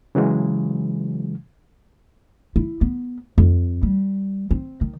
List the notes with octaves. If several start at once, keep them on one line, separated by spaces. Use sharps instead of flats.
C#3 E3 F#3 G#3
E4
B3
F2
G3
C4
D#3